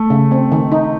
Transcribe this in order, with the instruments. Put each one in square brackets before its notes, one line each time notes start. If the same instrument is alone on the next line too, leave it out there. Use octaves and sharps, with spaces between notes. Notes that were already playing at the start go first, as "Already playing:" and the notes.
Already playing: [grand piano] A3
[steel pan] C#3
C4
D#3
D#4